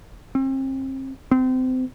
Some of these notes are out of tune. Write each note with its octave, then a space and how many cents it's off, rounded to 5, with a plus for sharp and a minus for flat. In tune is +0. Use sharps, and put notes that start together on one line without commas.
C4 +35
C4 -30